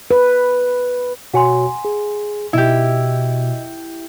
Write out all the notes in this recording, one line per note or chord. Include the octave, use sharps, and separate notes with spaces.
B4
B2 F#4 C#5 F#5 G#5 C6
G#4
B2 E4 G4 D#5